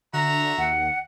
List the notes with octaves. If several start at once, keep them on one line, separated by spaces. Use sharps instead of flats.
D3 F#4 E5 A#5
D#2 F#5